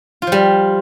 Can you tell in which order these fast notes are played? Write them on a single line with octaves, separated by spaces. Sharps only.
F4 F3 G3